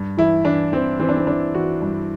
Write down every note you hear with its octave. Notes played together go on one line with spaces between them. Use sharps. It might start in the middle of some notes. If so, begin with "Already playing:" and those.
Already playing: G2
E3 E4
E3 D4
E3 C4
E3 C4
D4
C4
E3 D4
E3 F#4
G2